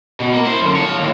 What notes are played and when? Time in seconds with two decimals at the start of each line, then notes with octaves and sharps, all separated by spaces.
0.20 B2
0.33 A#3
0.45 E4 C5
0.60 F#2 D3
0.75 F3 C#5
0.99 D#2 A2